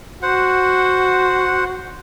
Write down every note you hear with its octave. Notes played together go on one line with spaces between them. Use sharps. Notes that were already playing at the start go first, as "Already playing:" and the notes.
F#4 C5 F#5